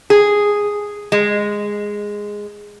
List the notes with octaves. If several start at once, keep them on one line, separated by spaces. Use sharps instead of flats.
G#4
G#3